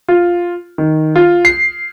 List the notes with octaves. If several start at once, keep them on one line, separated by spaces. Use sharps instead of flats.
F4
D#3
F4
C7